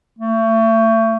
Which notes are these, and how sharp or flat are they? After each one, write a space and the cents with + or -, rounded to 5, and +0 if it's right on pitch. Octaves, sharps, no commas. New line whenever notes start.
A3 +30